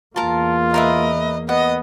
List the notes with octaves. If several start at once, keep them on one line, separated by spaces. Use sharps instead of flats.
E2 A#3 F4 A#4 A5
A#4 B4 D#5 E5
B3 D#5 F#5